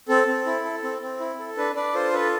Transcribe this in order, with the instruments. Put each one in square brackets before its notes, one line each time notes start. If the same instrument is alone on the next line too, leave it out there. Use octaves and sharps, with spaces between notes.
[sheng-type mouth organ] C4 A4
C4
E4
A4
C4
C4
E4
A4
D4 B4
D4 B4 D5
F4 A4 C5
A4 B4